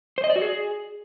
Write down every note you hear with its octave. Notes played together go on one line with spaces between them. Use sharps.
C5
D#5
D5
F#4
G#4